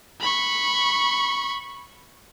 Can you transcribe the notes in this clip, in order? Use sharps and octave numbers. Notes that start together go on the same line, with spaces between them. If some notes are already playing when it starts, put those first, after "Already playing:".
B5 C#6